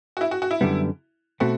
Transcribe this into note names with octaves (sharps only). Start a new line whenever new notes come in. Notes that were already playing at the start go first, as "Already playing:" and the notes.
F#4
E4
F#4
F#4
E4
F#2 D3 G3 B3
B2 A3 C4 F#4